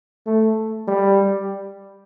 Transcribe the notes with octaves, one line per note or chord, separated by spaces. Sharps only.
A3
G3